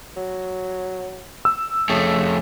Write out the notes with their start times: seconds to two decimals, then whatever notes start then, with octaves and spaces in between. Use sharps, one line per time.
0.16 F#3
1.45 E6
1.89 F2 C#3 A3